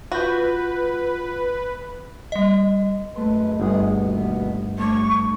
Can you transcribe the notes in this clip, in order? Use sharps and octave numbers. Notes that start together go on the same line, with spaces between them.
F4 F#4 B4 G6
G3 D#5
F#2 G#3 A3 B4 C6
G1 G#3 B3 G#4
D#2 B2 B3
G2 A3 D4 C#6